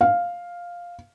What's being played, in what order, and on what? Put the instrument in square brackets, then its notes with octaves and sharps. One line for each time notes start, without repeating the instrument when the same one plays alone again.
[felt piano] F5